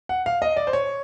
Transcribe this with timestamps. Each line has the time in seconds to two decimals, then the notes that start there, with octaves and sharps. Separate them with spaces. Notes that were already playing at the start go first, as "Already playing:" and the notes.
0.09 F#5
0.26 F5
0.42 D#5
0.57 D5
0.67 C5
0.73 C#5